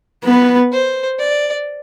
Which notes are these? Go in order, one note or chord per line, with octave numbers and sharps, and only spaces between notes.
B3 B4
C5
D5